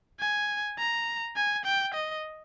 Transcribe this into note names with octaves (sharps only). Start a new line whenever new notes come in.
G#5
A#5
G#5
G5
D#5